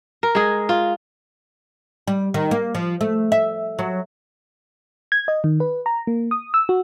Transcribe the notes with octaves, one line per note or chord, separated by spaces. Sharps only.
A#4
G#3 G#4
F4
G3
D#3
A#3
F3
A3
E5
F#3
G#6
D#5
D#3
B4
A#5
A#3
D#6
E6
F#4